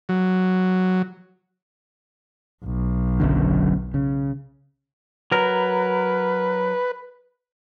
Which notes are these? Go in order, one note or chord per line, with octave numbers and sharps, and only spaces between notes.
F#3
B1
F#1 F#2 D3
C#3
F#3 A#4 B4